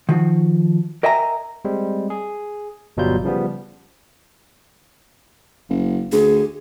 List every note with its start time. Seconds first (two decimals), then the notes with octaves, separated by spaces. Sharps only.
0.09 D#3 F3 F#4
1.03 A#4 D#5 E5 G5 G#5 A#5
1.65 G3 G#3 C4
2.10 G#4
2.97 G1 B2 F#3 G3 F4 G6
3.24 C#3 F3 G3 B3
5.69 F#1
6.12 D2 G#4